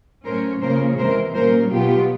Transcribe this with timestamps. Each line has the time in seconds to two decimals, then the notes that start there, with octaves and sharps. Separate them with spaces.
0.25 A2 F#3 A3 C#4 A#4 C5
0.61 C#3 F3 A#3 C#4 A#4 C5
0.98 C3 E3 G#3 A#4 C5
1.35 A#2 G3 A#3 C#4 A#4 C5
1.71 B2 F#3 B3 F4 G4